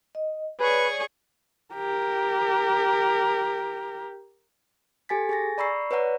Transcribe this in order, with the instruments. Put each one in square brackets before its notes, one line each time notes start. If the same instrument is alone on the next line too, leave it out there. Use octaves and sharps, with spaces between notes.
[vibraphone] D#5
[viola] G#4 C#6 [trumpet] B4 [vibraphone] C#5 D5
[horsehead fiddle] G4 A#4
[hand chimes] G4 A4 G#5 A6 B6
G#4 G#5 A6 A#6
D5 A#5 B5 C#6 E6 C7
B4 C#5 D5 F#5 A#5